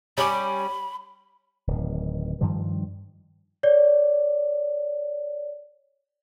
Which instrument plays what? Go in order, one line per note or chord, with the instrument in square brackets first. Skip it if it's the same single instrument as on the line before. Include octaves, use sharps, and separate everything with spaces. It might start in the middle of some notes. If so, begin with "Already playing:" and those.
[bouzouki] G3 C#4 [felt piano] G#5 D6 [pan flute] B5
[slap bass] D1 D#3
G2 D#3 F3 G3
[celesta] C#5 D5